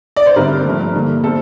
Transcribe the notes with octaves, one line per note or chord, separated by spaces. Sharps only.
D5
C5
G2 D3 G3 C4 E4 A#4
G2 D3 F3 A3
D3 G3 A#3
C3 G3 C4 A4